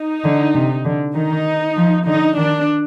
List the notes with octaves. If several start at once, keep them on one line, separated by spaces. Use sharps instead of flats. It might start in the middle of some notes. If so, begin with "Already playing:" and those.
Already playing: D#4
D3
C3
D3
D#3 D#4
F3
D3 D#4
D#3 D4